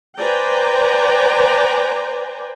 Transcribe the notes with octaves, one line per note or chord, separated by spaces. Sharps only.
B4 C5 D5 G5 G#5 A#5